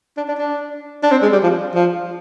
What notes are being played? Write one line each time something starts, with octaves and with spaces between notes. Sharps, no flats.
D4
D4
D4
D4
C4
G#3
G3
F3
F3